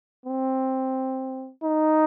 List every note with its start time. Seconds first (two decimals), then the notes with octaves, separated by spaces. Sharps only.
0.26 C4
1.63 D#4